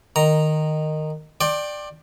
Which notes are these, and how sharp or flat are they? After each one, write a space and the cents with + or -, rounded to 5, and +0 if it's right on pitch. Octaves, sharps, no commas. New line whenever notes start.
D#3 -15 A#5 +0
D5 +15 G5 +0 C6 +40